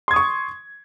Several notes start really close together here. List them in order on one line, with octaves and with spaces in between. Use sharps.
C6 G#6 D#6 C#6